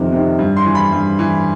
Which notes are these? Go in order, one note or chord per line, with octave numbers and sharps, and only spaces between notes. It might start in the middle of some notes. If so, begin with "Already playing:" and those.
Already playing: F2 C3 D#3
C3 D#3
G2
C6
E3
B5
G2
E3